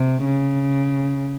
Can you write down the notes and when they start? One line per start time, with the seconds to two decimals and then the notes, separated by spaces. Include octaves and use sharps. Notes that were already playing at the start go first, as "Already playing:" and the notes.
Already playing: C3
0.25 C#3